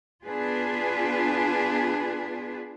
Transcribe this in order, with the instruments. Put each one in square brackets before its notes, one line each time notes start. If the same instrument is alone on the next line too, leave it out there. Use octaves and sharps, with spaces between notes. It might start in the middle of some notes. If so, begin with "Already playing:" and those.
[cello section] B3 D4 F4 G#4 B4